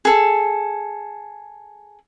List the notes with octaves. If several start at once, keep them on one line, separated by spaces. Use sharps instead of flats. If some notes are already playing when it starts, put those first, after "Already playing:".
G#4 A4